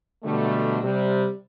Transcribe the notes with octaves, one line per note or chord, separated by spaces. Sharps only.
B2 D3 F#3 G3 A3
C3 G3